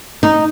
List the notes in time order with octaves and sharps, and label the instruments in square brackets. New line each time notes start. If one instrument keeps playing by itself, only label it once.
[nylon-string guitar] D#4